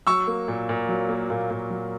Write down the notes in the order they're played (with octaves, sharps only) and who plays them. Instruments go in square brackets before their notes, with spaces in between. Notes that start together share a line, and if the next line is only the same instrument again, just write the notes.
[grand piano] F#3 C#6 E6
A#3
A#2
A#2
F#3
A#3
A#2
A#2
F#3